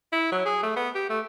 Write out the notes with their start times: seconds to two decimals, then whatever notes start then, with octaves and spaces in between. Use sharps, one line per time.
0.13 E4
0.32 F#3
0.46 G#4
0.63 A3
0.76 B3
0.95 G4
1.10 A3